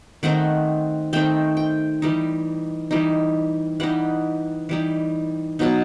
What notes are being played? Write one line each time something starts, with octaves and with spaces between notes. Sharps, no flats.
D#3 A3 C4 D#4 F#5
D#3 A3 C4 D#4 G5
G5
E3 G3 D#4
E3 G3 D#4
E3 G3 D#4 F#5
E3 G3 D#4
B2 F#3 B3 D#4